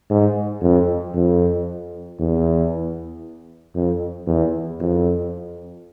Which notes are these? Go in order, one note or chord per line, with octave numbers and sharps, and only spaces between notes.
G#2
F2
F2
E2
F2
E2
F2